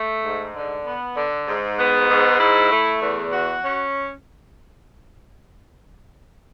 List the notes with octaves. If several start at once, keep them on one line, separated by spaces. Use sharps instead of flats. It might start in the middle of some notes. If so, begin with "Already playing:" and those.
Already playing: A3
G#2
D3
B3
D3
G#2
B3
G#2
E4
A3
E2
F#4
C#4